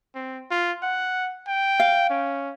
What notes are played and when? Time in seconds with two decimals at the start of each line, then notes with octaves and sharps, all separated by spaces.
0.15 C4
0.51 F4
0.82 F#5
1.48 G5
1.80 F5
2.10 C#4